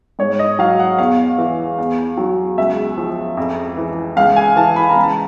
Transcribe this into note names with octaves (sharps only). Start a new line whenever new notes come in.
G#2 C#5
D#5
F#3 F5
F#5
E2 F5
E3
E2
F#3
C#2 E5
F3
F2
E3
C#2 F5
G#5
E3 A5
B5
A#5
C#2
A5